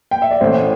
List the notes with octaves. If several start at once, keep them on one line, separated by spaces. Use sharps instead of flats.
G5
E5
D5
A1 A2 E3 C5